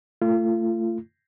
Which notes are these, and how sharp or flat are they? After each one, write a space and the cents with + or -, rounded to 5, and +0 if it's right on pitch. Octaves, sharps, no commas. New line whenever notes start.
A3 +25 F4 -30